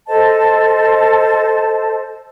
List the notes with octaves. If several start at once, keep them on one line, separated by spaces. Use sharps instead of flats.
A4 C5 D#5 A5